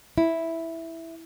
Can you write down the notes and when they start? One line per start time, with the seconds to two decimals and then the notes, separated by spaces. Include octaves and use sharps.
0.18 E4